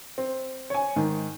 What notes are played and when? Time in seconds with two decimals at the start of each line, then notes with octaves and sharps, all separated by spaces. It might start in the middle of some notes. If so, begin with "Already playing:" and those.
0.18 C4
0.70 C#5 G#5
0.96 G#2 D#3